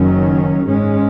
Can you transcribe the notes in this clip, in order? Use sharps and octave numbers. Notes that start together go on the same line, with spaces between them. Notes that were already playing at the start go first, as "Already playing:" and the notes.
Already playing: F#1 F#2 D#3 F#3 C#4
G#2 G#3 C#4